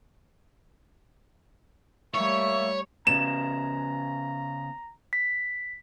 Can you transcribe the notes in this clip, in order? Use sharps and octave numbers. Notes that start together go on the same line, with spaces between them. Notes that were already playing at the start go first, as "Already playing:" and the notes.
G3 A3 A#3 C#5 E5 C#6
C#3 B3 A#5 E7
B6